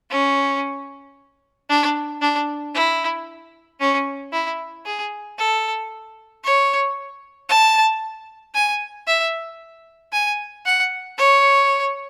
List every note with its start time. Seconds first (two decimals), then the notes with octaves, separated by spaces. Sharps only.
0.10 C#4
1.69 D4
2.21 D4
2.74 E4
3.80 C#4
4.32 E4
4.85 G#4
5.38 A4
6.43 C#5
7.49 A5
8.54 G#5
9.07 E5
10.12 G#5
10.65 F#5
11.18 C#5